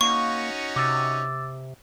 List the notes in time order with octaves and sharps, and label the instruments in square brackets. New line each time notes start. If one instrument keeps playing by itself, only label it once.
[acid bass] A#3 [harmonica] C#4 D#4 F#4 [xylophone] C#6
[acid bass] C3 [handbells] D6 E6 A6